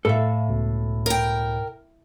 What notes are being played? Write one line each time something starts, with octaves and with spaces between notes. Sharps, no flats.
A2 A4 E5 F5 A5
C#2 B2
A#4 G5